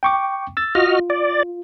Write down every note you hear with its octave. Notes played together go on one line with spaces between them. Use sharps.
G5 C#6 D6
E6 A6
F4 F#4 D#5 F6
D5